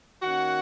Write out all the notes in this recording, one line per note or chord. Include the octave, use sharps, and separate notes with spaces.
D#3 A#3 C#4 F#4 F#5